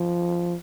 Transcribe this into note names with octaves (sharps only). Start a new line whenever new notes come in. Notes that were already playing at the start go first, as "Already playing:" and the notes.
Already playing: F3